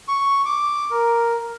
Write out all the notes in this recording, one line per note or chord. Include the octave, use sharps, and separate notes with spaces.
C#6
D6
A#4